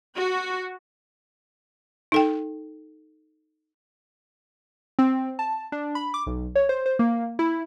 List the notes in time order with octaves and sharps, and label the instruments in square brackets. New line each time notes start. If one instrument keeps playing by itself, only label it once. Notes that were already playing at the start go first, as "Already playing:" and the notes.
[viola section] F#4
[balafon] D#4 A4 G5
[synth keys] C4
A5
D4
B5
D6
B1
C#5
C5
C5
A#3
E4